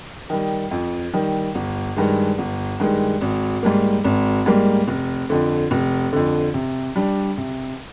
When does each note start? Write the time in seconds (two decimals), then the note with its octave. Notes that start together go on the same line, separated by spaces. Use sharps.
0.30 D#3 G3
0.71 F2
1.13 D#3 G3
1.55 G1
1.96 G2 D#3 G#3
2.38 G1
2.80 G2 D#3 G#3
3.21 G#1
3.63 G#2 G3 A#3
4.04 G#1
4.46 G#2 G3 A#3
4.88 F1
5.30 F2 D3
5.71 F1
6.13 F2 D3
6.54 C3
6.96 G3 D4
7.38 C3